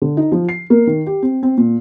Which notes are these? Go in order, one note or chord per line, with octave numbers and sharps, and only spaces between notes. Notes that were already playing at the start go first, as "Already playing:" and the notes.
D3
D#4
F3
C7
A#3
D#3
G4
C4
C4
A#2